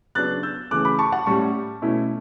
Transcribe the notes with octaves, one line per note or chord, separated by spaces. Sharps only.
C#3 F#3 B3 D4 F#6 A6
E6 G6
C#3 E3 A3 C#4 D6 F#6
B5 D6
A5 C#6
F#5 A5
A2 G3 C#4 A5 C#6
B2 A3 C#4 E4